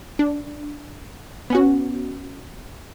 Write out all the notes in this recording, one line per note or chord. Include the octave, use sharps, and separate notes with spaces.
D4
B3 C#4 F#4